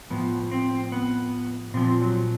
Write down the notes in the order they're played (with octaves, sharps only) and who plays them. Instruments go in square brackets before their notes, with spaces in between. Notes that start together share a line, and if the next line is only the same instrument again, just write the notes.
[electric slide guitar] A2 F3 B3
C4
B3
A#2 F3 C4
F#3